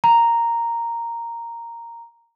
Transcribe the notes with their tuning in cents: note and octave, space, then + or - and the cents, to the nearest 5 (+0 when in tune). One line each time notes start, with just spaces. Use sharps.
A#5 -5